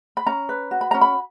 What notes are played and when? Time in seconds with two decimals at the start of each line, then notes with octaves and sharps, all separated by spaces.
0.17 B5
0.26 C#4 A#5
0.49 B4
0.71 F#4
0.81 B5
0.91 C#4 A#5
1.01 B5